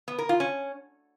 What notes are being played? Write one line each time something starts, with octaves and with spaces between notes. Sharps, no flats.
B3
A#4
F4
C#4